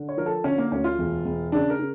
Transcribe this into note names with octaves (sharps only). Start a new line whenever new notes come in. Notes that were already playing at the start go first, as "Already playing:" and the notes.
Already playing: D3
C#5
F3 A#4
A4
D3 C#4
A#3
D2 C#4
F4
E1
E1
C#3 D4
A#4
C#3